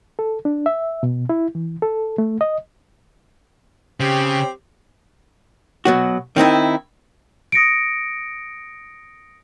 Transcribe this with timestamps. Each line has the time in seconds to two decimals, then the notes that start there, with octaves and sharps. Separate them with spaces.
0.19 A4
0.45 D4
0.66 E5
1.03 B2
1.29 E4
1.55 E3
1.82 A4
2.18 A3
2.41 D#5
4.00 C#3 C4 G4
5.85 B2 F#3 F#4
6.36 D#3 C4 D#4 E4
7.52 D#6 A#6 C#7 D7